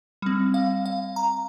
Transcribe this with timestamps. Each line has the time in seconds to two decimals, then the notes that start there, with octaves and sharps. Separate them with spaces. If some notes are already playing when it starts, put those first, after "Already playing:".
0.22 G3 C4
0.54 F5
0.86 F5
1.16 A#5